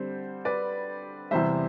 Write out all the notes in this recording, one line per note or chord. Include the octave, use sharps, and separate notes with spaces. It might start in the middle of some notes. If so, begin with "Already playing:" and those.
Already playing: D3 G3 C4 C5
B4 D5
E2 C3 E3 G3 C5 E5